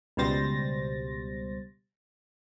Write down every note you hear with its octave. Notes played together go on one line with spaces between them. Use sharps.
C#2 B2 G3 C5 A6 A#6